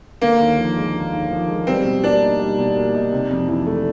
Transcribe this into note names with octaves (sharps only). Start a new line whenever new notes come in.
D3 A#3
D#2
F3
G#3
D3
D#2
F3
G#3
G3 C4
B2
A#3 D4
D#4
G3
B2
A#3
D#4
C3
F2
E3
A3